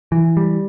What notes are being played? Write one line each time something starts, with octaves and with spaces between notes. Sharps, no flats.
E3
G3